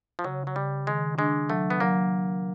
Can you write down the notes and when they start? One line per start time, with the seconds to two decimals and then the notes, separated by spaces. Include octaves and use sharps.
0.19 F3
0.24 C#3 F#3
0.47 F#3
0.56 C#3 G3
0.87 D#3 G#3
1.18 G#3 D4
1.50 F#3 A3
1.70 B3
1.80 F#3 A#3